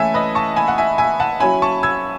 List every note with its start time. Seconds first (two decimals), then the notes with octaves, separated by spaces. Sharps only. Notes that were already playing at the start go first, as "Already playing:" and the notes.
Already playing: E3 A3 C#4 E4 E5 G#5 A5
0.14 B4 D#5
0.35 A5 C#6
0.56 G#5 B5
0.68 F#5
0.78 E5 G#5
0.98 E5 G#5
1.20 F#5 A5
1.40 F#3 C#4 E4 G#5 B5
1.62 A5 C#6
1.83 E6 G#6